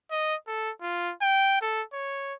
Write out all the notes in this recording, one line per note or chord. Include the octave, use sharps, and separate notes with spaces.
D#5
A4
F4
G5
A4
C#5